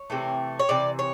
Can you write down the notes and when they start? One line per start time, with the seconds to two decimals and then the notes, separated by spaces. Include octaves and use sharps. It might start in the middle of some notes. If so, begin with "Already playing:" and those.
Already playing: C#5
0.10 C3 E3 A3
0.59 C#5
0.69 C3 E3 D5
0.99 C#5